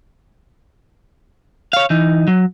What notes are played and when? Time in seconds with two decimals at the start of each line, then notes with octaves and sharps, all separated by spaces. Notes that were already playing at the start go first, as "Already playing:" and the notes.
1.73 C#5 F5
1.90 E3 D#4
2.28 F#3